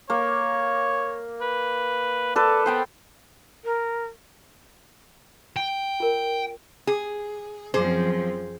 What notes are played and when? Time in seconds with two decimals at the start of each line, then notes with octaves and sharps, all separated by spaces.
0.10 A#3 C#5
1.41 B4
2.36 A4 B4 D5
2.66 B3 C5 G5 B5
3.64 A#4
5.56 G5
6.00 F4 A#4
6.87 G#4
7.74 F#2 F3 C4 G#4 C5